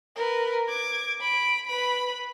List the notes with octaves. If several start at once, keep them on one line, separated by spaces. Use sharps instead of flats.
A#4 B4
D6 G#6
B5 D7
B4 B5